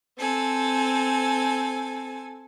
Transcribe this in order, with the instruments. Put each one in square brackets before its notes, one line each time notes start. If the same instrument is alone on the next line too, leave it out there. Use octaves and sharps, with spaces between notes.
[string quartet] C4 A4 G#5